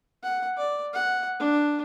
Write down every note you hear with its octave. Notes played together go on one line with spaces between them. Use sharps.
F#5
D5
F#5
D4